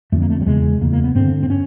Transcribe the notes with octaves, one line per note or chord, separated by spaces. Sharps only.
F2 D3 A3
A#3
A3
G3
E2 C#3 G#3
E2 C#3 A#3
A#3
B3
G2 D3 C4
C4
C#4